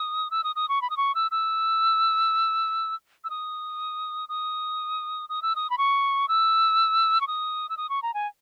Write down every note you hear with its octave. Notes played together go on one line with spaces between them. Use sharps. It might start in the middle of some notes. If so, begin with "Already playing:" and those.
Already playing: D#6
E6
D#6
D#6
C#6
B5
D#6
C#6
E6
E6
E6
D#6
D#6
D#6
E6
D#6
B5
C#6
E6
C#6
D#6
E6
D#6
C#6
A#5
G#5